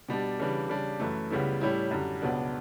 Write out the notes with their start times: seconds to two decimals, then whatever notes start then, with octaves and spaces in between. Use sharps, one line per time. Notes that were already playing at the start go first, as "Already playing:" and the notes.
0.09 B2 G3 D4
0.39 C#3 E3 G3 D4
0.69 C#3 G3 D4
1.00 F#2 E3 A3
1.30 C#2 C#3 G3 B3 E4
1.61 A2 G3 C#4 E4
1.91 F#2 D3 G3
2.22 C#2 B2 F#3 B3 D4